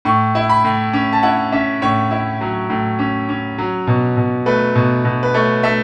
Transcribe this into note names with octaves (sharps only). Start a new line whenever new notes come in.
A2 C#6
E4
B5
A2
C#4
A5
E4 F#5
C#4 E5
A2 C#5
E4
F#3
A2
C#4
C#4
F#3
B2
B2
A3 B4
B2
B2
B4
A3 C#5
A3 E5